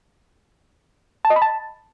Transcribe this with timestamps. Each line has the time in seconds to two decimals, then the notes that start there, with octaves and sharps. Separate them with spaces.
1.25 A5
1.30 D#5
1.36 B5
1.42 A5